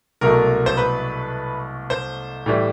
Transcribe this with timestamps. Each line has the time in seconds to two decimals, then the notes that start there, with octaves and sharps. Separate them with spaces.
0.21 C2 B2 F#3 A3 A#4
0.66 C5
0.77 B4
1.90 C5
2.46 A2 E3 G3